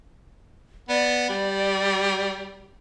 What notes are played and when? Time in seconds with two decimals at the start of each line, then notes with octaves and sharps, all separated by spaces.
0.89 B3 D5
1.29 G3